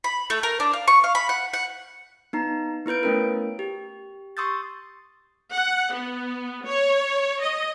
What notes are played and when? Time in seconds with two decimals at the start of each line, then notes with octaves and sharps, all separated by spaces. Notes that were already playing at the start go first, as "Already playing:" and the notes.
0.04 B5
0.30 A3
0.43 A#4
0.60 D4
0.73 F5
0.88 C#6
1.04 F5
1.15 B5
1.29 F#5
1.53 F#5
2.33 B3 D#4 A#5
2.86 B3 E4 B4 G6 D7
3.03 A3 B3 C#4 E4 A#4
3.59 G4
4.37 C6 C#6 D#6 E6 G6 A6
5.52 F#5
5.94 B3
6.66 C#5
7.40 D#5